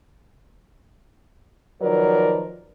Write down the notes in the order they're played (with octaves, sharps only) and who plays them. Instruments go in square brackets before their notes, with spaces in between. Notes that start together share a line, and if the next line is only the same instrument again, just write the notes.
[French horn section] D#3 F3 F#3 A#4 B4 D5